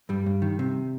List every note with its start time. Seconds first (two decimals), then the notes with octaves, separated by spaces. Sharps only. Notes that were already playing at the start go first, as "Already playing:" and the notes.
0.09 G2 G3
0.26 G2
0.42 D#3
0.59 C3